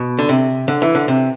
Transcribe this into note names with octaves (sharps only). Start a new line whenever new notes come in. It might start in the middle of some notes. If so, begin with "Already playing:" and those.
Already playing: B2
D3
C3
D3
E3
D3
C3